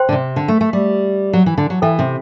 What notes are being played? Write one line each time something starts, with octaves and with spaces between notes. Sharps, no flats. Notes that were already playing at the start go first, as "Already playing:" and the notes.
Already playing: C5 G5 C6
D3
C3
D3
A3
A3
G3
F#3
E3
D3
F#3
E3 A4 E5 G5
C3